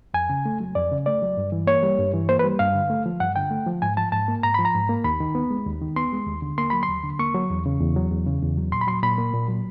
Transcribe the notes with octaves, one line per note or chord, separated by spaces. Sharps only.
F2 G#5
C#3
A3
F#3
F2 D5
C#3
A3 D5
F#3
G2
E3
A#3 C#5
G3
G2
E3
A#3 C5
B4
G3
G2 F5
D3
A3
F3
G2 F#5
D3 G5
A3
F3
G#2 G#5
F3 A5
G#2 A5
A#3
G#2 A#5
F3 B5
A#5
G#2
A#3
D#2 B5
D#3
B3
G#3
D#2
D#3
B3 C6
G#3
D#2
D3
A#3 C6
F#3 B5
C6
D#2
D3
A#3 C#6
F#3
E2
C#3
E2
F#3
E2
C#3
E2
F#3
A#2 C6
B5
F#3 C6
A#2 B5
A#3
A#2
F#3